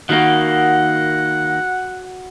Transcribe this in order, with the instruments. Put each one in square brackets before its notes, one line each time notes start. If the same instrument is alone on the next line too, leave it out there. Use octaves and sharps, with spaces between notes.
[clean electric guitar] D#3 A#3 [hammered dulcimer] F#4 B5 C#6 [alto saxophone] F#5